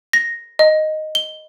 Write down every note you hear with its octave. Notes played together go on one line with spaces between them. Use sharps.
A#6
D#5
G7